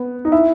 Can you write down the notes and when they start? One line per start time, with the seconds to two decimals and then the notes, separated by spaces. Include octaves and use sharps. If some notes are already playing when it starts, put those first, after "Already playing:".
Already playing: B3
0.25 D#4
0.32 E4